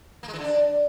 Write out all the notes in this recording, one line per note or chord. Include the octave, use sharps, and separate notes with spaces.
A#3
G#3
E3
D3
D4